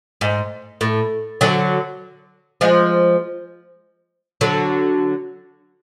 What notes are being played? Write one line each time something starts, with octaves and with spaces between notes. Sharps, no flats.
G#2
A2
D3 F#3
F3 G#3
D3 F#3